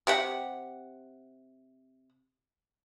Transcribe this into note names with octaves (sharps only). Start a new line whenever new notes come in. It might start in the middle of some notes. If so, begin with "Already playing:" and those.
C3 G4 F#5